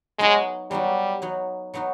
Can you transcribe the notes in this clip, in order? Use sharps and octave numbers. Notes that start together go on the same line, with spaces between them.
F#3 G#3 B3 D#4 F#4
F#3 G3 B3 D#4 F#4
F#3 B3 D#4 F#4
F#3 B3 D#4 F#4